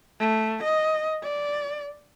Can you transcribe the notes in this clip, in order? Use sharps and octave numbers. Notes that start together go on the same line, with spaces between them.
A3
D#5
D5